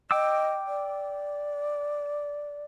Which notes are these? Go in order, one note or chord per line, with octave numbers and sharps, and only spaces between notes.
D#5 G5 D6 E6
D5